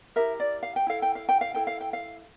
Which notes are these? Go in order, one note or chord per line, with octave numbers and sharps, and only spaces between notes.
E4 G4 A#4 E5
D5
F5
G5
E4 A4 F5
G5
F5
G5
F5
E4 A4 G5
F5
G5
F5